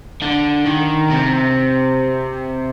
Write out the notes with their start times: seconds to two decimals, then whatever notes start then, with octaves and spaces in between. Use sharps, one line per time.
0.22 D3
0.66 D#3
1.11 C3